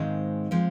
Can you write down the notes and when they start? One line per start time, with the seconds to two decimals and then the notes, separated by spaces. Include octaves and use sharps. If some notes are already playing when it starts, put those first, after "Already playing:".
Already playing: G#2 D#3 G#3 C4 F5
0.51 F3 G#3 C4